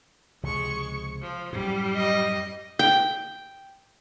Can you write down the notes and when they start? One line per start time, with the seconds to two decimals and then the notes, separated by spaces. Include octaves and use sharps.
0.43 C#2 C3 F3 G#3 C#6
1.21 F3
1.53 F#2 A2 G3
1.96 D#5
2.79 G5